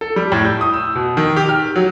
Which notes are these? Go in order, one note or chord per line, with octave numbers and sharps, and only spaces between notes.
A4
G3
A2
G6
D#6
E6
B2
D#3
G4
F6
F#3